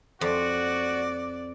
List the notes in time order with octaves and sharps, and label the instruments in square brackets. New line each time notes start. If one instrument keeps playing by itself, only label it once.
[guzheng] F2 [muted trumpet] F#4 [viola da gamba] D5